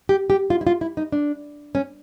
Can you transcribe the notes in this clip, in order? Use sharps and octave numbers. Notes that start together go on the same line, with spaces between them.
G4
G4
F4
E4
F4
E4
D#4
D4
C#4